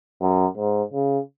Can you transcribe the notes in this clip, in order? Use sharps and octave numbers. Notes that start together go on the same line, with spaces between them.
F#2
G#2
C#3